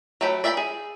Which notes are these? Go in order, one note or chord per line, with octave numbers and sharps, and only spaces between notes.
F#3 A3 G5 B5
D5 E5 G5 A#5 B5
G#4